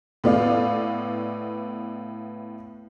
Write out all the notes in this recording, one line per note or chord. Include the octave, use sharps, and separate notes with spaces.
A2 B3 D5 F5